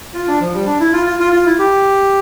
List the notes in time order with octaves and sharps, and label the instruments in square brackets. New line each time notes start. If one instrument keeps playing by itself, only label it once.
[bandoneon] F4
D4
F3
G3
D4
E4
F4
F4
F4
F4
E4
G4